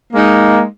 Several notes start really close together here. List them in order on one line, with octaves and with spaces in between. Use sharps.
A#3 G#3 D#4